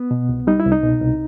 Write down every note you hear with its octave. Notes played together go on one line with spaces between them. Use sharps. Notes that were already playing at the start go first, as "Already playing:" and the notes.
Already playing: B3
B2
C2
G3 D#4
E4
C2
D#4
B2
C2